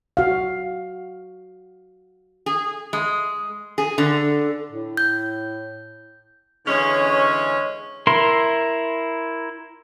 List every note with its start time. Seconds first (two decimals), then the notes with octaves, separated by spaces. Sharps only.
0.17 F#4 F5
2.46 G#4
2.93 G#3
3.78 G#4
3.98 D3
4.71 A2
4.97 G6
6.67 D3 E3 G#3 C#4
8.07 E4 A#4 C6